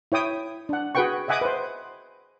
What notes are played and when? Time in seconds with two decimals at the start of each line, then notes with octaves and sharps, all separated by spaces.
0.12 E4 C#5 G5 D#6
0.69 D4 F#5
0.95 F#4 G#4 B4 F#5 G5 C#6
1.28 D#5 E5 F#5 G#5 D6 D#6
1.41 B4 C5